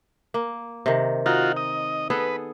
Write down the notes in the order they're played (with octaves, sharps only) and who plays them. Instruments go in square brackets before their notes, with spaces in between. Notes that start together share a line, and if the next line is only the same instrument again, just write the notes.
[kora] A#3
C3 D#3
[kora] D#4 [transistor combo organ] F4 F#4
[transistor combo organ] D#5
[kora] B3 G#4 A4 [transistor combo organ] B4